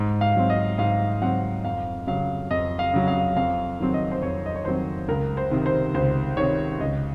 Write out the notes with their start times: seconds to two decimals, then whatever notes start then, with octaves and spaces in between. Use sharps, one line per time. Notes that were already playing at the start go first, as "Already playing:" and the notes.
Already playing: G#2
0.21 F5
0.36 F#3 C4
0.50 D#5
0.78 G#2 F5
1.22 F#3 C4 F#5
1.65 F2 F5
2.07 C#3 F#3 F5
2.51 F2 D#5
2.79 F5
2.94 C#3 F#3
3.08 F5
3.36 F2 F5
3.79 D#3 F#3 C4
3.94 D#5
4.12 C5
4.22 F2 C#5
4.46 D#5
4.56 C#5
4.65 D#3 F#3 C4 C5
5.08 C#2 A#4
5.37 C5
5.51 C3 D#3
5.66 C5
5.94 C#2 C5
6.37 C3 D#3 C#5
6.80 C#2 D#5